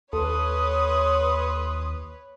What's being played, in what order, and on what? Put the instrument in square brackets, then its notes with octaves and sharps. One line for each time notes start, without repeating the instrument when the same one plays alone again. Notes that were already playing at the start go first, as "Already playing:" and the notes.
[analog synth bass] D#2 [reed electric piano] A4 [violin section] B4 C#5 [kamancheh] C6 D#6